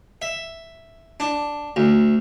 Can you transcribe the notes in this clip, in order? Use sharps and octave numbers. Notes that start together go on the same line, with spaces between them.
E5
D4
D2